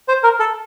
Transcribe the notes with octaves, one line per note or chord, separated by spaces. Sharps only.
C5
A#4
A4